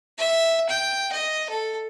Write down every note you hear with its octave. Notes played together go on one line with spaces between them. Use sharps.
E5
G5
D#5
A4